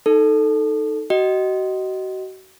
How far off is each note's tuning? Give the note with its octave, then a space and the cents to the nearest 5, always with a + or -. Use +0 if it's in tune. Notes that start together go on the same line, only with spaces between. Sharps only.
D#4 +0 A4 +0
F#4 +35 D#5 +0